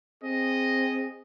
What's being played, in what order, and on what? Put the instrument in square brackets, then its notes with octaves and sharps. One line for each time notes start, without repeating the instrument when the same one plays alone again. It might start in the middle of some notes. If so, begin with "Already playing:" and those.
[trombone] C4 [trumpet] G#4 [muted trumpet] D#5